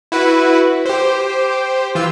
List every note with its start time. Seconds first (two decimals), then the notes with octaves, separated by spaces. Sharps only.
0.12 E4 F#4 B4
0.85 G4 C5
1.95 E3 F4 E6